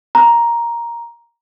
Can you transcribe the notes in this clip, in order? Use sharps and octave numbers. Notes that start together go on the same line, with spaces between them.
A#5